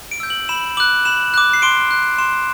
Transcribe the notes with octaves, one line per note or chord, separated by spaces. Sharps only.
D7
E6 G6
F#7
B5 E7
D6 F#6 F#7
B5 E7
D6 F#6
C7
C6 D7
F#6
C6 E7